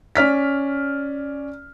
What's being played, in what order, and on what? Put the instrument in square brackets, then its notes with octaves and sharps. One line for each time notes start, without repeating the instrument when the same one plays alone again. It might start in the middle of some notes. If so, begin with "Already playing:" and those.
[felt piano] C#4 D5 F6 B6